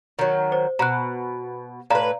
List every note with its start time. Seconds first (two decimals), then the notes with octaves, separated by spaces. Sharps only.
0.19 D#3 F#3
0.52 C5
0.79 B2 A#5 F#6
1.90 A2 B4 D5 F5 A#5